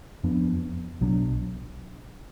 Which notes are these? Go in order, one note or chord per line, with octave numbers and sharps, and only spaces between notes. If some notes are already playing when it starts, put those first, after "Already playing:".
F2 F3 B3 D4
B1 B2 F#3 D4